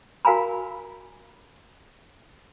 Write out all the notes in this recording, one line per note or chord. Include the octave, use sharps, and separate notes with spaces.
F#4 A#4 F5 G#5 A#5 B5